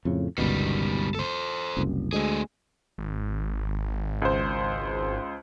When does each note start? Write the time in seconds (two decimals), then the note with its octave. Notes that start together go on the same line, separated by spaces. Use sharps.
0.05 F2 A2 C#3
0.38 G1 C#2 B2 D#3 G3
1.15 A4 C5
1.77 F#1 C2 F#2
2.13 D2 G#3 A3 G#4
2.98 G#1
4.22 C#2 C5